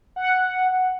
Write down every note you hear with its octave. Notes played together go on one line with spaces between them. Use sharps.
F#5